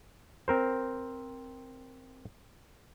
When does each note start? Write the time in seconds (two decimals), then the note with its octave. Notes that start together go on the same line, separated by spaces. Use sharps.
0.48 C4 A#4 C5